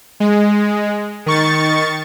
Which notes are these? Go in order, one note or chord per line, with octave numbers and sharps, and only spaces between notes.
G#3
D#3 C#6 A6